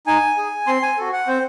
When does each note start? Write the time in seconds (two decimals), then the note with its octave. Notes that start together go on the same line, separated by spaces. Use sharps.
0.07 D#4 G#5
0.37 G#4
0.67 C4 C6
0.83 G#5
0.98 F#4 A4
1.13 F#5
1.27 C4 C5